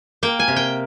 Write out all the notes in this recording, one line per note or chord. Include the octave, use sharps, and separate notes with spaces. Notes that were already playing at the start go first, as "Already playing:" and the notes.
A#3 G5
G#5
C3
G5